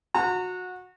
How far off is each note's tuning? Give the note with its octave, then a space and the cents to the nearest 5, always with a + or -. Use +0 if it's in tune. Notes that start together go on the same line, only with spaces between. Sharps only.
F#4 -20 A#5 -35